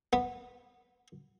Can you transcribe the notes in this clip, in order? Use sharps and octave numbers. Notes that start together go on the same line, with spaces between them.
B3